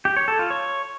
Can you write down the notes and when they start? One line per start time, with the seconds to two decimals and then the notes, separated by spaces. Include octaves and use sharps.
0.05 G4
0.17 C#5
0.28 A4
0.39 F4
0.50 C#5